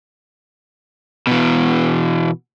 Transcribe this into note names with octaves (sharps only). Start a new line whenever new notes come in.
B2 E3